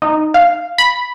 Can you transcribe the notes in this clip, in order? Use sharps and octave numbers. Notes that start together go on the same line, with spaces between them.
D#4
F5
B5